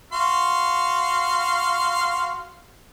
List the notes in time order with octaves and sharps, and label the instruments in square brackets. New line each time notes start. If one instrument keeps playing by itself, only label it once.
[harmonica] F#4 F5 C6